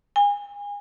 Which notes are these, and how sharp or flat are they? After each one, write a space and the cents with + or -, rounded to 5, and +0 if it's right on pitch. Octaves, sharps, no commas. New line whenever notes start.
G#5 -30